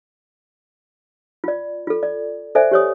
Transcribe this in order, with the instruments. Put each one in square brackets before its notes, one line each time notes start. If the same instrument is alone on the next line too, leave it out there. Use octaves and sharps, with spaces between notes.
[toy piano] F4 D5
F4 A4
D5
A4 C5 D5 E5 G#5
G4 C#5 D#6